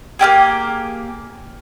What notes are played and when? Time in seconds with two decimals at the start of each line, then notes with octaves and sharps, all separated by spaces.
0.19 A#3 C#4 G4 G#4